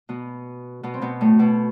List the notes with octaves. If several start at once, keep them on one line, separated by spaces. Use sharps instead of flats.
B2 B3
B2 B3
C4
B2 B3
A2 A3
B2 B3